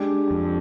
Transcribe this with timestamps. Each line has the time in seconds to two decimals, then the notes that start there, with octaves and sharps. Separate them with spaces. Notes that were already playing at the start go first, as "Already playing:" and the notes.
Already playing: G#3 D4 G4 D5
0.31 F2